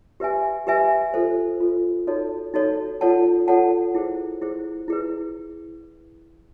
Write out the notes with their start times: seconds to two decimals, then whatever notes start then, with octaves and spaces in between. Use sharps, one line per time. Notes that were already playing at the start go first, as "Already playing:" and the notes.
0.20 G4 B4 E5 G#5
0.67 G4 B4 E5 G#5
1.14 F4 A4 C5
1.60 F4 A4 C5
2.07 D#4 F#4 A4 C#5
2.54 D#4 F#4 A4 C#5
3.01 F4 A4 C#5 F#5 A5
3.48 F4 A4 C#5 F#5 A5
3.95 E4 G#4 C5
4.41 E4 G#4 C5
4.88 E4 G#4 B4